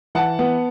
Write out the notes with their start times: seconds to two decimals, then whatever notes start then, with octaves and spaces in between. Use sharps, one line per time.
0.15 E3 F#5 A5
0.39 B3